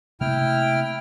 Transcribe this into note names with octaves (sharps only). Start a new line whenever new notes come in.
C3 A3 A#3 E4 G5 F6